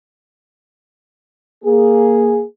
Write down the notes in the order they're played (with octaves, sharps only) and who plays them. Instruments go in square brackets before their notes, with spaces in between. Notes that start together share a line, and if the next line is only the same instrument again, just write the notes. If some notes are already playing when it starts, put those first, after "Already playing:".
[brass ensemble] A#3 G#4